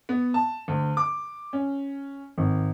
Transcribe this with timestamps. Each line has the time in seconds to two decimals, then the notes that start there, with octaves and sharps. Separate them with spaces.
0.09 B3
0.34 A5
0.68 D2
0.97 D6
1.53 C#4
2.38 G#1